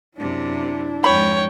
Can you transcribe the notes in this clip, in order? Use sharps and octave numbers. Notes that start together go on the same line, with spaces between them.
F#2 C3 D4 E4
F2 G#2 C#5 G5 B5